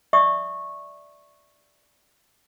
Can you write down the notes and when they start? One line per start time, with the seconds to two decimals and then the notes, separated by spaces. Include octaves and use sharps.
0.13 D5 E5 C#6 D#6